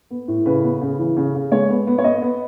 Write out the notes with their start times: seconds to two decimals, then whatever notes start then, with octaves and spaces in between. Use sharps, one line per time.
0.11 B3
0.28 A2
0.46 C#3 B4
0.63 B3
0.81 C#3
0.99 E3
1.17 C#3
1.34 C#3
1.52 G#3 C#5
1.70 B3
1.87 B3
1.98 C#5
2.04 B3 D#5
2.22 B3